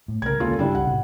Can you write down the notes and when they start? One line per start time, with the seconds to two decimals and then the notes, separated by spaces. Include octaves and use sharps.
0.08 A2
0.22 C2 C#3 A#4 G#6
0.40 D2 G#3 A#3 C#4 F4 A4
0.59 F#2 C#3 F#3 G3 D4 E4
0.75 C2 F#5
0.87 A2 C3